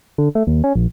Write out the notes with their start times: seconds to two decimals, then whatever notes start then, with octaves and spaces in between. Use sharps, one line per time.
0.18 D3
0.35 A3
0.47 D#2
0.64 C#4
0.75 A#1